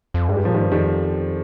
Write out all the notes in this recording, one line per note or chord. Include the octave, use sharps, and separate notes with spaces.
F2
G2 G#3
G3
A#2 F3
G#2 D#3 G3
G2
F2 D#3 G3